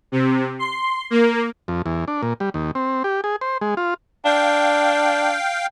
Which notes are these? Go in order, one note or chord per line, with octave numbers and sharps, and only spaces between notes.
C3
C6
A#3
F2
E2
D4
A#2
G3
D#2
C4
G4
G#4
C5
G#3
F4
D4 F5 G5